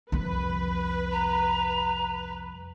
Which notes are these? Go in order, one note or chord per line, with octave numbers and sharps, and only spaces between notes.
C2 F2 B4
A#5